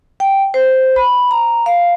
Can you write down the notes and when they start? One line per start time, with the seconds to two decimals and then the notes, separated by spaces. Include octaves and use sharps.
0.20 G5
0.54 C5
0.96 B5
1.31 A#5
1.66 F5